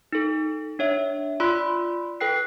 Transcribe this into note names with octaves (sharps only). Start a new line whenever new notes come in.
D#4 A4
D4 C#5 E5
F4 D5 B5 C6 E6 B6
A4 B4 G5 F#6 C7